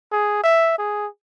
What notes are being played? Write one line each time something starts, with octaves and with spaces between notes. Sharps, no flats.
G#4
E5
G#4